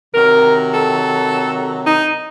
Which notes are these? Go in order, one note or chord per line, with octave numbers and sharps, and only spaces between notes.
C3 D#3 F#3 A#4
A4
D#4